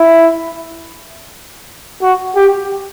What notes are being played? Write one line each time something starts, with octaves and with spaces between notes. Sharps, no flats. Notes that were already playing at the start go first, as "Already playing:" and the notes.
Already playing: E4
F#4
G4